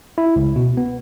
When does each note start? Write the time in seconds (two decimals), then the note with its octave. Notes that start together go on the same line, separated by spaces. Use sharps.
0.18 E4
0.36 C#2
0.56 B2
0.77 B3